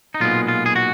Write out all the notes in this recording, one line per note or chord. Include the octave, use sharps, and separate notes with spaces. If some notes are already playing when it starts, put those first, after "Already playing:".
D#4
B1 A#2 G#3 B3 F4
F4
G#4
F#4